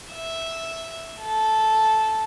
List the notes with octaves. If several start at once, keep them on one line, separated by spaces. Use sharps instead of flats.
E5
A4